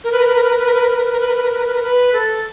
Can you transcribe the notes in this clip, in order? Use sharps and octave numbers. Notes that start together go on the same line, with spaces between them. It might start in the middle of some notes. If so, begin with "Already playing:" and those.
A#4
B4
A#4
B4
A#4
B4
A#4
B4
A#4
B4
A#4
B4
A#4
B4
A#4
B4
A#4
B4
A#4
B4
A#4
B4
A#4
B4
A4